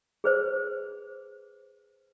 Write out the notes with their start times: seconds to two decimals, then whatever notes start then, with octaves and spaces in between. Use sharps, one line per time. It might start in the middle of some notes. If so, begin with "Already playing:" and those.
0.24 G#4 B4 C5